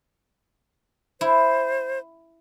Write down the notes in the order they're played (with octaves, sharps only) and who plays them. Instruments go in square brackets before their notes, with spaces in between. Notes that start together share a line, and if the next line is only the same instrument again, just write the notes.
[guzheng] E4 [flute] C5